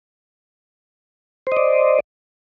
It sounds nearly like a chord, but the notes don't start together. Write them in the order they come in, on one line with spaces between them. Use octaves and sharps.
C5 D#5 D5